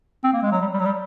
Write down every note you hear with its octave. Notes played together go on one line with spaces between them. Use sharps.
C4
A#3
G#3
F#3
G3
G3
F#3
G3